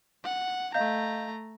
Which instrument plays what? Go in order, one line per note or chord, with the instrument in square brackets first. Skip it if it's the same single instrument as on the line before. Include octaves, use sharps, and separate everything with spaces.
[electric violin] F#5
[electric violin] A3 A#5 [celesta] D#5 F5 G6